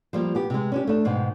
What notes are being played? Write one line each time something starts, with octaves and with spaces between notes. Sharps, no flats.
F3 G3 A#3
B3 G4
C3 G#3
C#4 D4 G4
A3 D4
G#2 B2 D#3